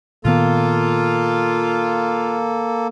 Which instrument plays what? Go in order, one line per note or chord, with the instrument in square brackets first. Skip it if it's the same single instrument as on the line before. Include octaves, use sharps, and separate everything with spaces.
[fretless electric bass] A#2 D#3 B3 [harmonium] A#3 A4 [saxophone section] F4